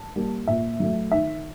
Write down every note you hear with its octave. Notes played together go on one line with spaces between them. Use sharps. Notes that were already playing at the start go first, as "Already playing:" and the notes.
Already playing: A5
G3 A#3
A#2 E5
F#3 A3
D#3 E5